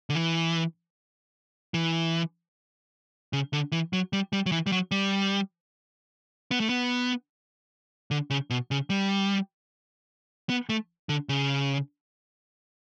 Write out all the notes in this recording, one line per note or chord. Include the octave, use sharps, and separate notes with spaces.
D3
E3
E3
C#3
D3
E3
F#3
G3
G3
F#3
E3
G3
F#3
G3
B3
A3
B3
D3
C#3
B2
C#3
G3
B3
A3
D3
C#3